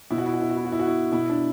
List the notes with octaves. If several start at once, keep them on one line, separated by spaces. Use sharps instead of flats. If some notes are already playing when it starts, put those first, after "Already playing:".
B2 E4
F#4
E4
F#4
E4
F#4
E4
F#4
E4
F#4
E4
B2 E4
D4